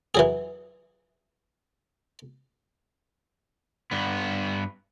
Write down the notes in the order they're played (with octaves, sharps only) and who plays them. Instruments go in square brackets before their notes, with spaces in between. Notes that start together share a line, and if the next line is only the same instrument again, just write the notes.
[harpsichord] E3 F#3 G#4
[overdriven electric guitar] G2 B3